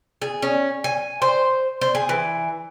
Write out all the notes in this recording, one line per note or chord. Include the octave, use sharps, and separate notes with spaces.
G#4
C#4
G#5
C5
C5
G#4
E3